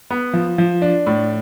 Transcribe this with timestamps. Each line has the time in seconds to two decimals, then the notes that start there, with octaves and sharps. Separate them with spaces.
0.11 B3
0.33 F3
0.58 F3
0.82 D4
1.07 A2